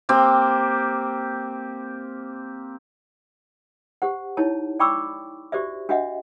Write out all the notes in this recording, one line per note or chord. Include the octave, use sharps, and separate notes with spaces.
A#3 C4 G4
G4 C5 F#5
D#4 E4 C#5 A5
D5 G5 B5 C#6 D6 E6
F#4 G4 C5 D5 E5
D4 F#4 D#5 E5 F#5